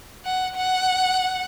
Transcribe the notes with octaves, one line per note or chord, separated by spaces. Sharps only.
F#5
F#5